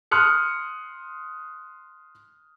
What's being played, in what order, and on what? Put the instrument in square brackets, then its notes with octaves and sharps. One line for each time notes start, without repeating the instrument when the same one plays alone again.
[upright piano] C6 D#6 F6 F#6 C#7